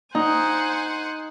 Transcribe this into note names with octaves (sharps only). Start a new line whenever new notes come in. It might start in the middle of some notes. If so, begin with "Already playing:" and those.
D#4 C5 F#5 G#5